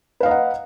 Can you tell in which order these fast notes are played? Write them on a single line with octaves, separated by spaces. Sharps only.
B4 F5 D#5 A#5 F#5